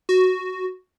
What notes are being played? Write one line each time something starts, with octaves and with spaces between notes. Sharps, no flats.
F#4